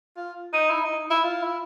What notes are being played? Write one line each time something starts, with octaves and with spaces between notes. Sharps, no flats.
F4
D#4
E4
D#4
E4
F4
E4